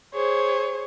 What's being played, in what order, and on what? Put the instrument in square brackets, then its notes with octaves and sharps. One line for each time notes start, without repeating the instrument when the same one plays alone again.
[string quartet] G#4 C5 C#5